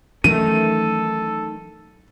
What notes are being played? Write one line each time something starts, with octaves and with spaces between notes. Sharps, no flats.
D#3 E3 F#3 A3 C#4 A4 D#7